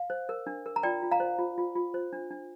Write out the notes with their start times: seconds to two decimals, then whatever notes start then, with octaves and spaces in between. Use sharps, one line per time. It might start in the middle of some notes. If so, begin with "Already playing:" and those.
Already playing: F5
0.10 C5
0.29 A#4
0.47 D4
0.66 A#4
0.76 A#5
0.83 F4 D5 G5
1.02 F4
1.11 F5 A#5
1.20 C5
1.39 F4
1.58 F4
1.76 F4
1.94 C5
2.13 D4
2.30 D4